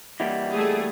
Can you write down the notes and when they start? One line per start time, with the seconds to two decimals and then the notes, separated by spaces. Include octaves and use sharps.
0.20 E3 G3 A#3 D#5 E5 F#5
0.53 A3 G#4